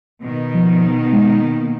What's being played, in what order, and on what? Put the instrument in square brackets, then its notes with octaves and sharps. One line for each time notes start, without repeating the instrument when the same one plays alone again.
[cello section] B2 D#3
[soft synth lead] F3
G#3
A#3